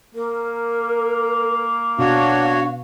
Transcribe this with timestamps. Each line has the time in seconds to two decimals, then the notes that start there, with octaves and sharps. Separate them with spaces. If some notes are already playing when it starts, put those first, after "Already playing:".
0.15 A#3 A#4
1.99 B2 D4 F#4 C#5 F5